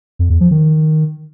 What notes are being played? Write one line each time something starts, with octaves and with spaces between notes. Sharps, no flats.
F2
E2
F3
D#3